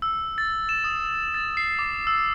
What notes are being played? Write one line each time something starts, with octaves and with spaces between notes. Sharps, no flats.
E6
A6
E7
D#6
A6
C7
D6
E6